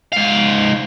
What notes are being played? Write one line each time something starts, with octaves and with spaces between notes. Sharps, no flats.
G#2 F5